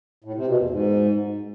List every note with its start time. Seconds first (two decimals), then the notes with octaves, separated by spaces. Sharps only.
0.24 A2
0.36 C3
0.47 B2
0.59 E2
0.70 G#2